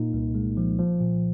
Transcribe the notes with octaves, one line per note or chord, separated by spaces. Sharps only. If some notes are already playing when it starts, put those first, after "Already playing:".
Already playing: A#2 A#3 D#4
C2
G#3
F3
F3
A#2